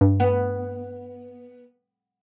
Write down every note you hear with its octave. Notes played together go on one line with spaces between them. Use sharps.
G2
B3